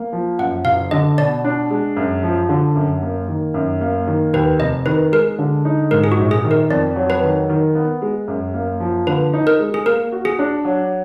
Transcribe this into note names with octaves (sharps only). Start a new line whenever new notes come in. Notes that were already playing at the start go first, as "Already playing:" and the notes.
Already playing: A#3
F3
F#2 F#5
F#1 F5
D3 D#5
B2 D5
D4
G#3
F#2
F3
D3
F#2
A#3
D#3
F#2
A#3
D#3
D#2 B4
F1 D#5
D#3 B4
G#3 A#4
D3
D#4
G#2 A#4
G#4
F#4
A#1
G#4
D#3
A#4
F2 D5
F#3
B4
D#3
D#3
B3
G#3
F#2
A#3
F3
D3 B4
D#4
A#4
G#3
G#4
A#3 A#4
F#4
G#4
D4
F#3